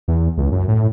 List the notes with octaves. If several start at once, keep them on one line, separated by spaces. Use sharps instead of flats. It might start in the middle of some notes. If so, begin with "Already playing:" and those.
E2
C#2
F#2
A2